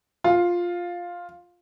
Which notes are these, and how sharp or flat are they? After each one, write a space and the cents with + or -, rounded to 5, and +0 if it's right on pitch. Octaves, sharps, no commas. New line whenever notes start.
F4 +5